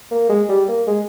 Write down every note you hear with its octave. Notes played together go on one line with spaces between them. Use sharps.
A#3
G#3
G3
A#3
G#3